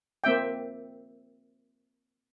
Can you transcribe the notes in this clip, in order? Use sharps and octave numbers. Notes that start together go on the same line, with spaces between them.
A#3 C4 E5 G5